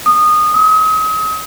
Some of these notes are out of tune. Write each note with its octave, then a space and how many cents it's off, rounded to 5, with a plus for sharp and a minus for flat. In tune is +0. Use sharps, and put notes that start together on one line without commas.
D#6 -20
D#6 +40